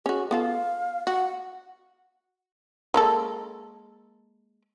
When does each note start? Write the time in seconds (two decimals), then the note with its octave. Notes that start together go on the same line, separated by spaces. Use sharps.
0.06 C#4 F#4 G#4
0.31 B3 F4 A4 F5
1.07 F#4 F#5
2.94 G#3 A#3 A4